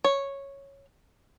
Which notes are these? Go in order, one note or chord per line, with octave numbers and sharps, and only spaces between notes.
C#5